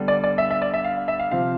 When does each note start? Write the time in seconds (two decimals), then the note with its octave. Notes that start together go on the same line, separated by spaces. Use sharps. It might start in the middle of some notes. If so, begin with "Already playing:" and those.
Already playing: D3 G3 B3 D4
0.08 D5
0.24 D5
0.38 E5
0.51 E5
0.62 D5
0.74 E5
0.84 F5
0.96 F5
1.08 E5
1.19 F5
1.31 C3 F3 C4 F5